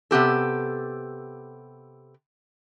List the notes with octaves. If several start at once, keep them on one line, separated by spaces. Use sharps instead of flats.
C3 B3 G4 A4